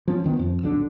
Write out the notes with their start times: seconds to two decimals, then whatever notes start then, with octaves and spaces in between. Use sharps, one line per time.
0.08 F3 C#4
0.24 D2 D#3 B3
0.37 F2 F3
0.62 D1 B1 D3 D4